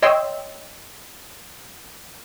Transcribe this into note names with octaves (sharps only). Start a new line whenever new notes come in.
C#5 D#5 E5 G5 C6 E6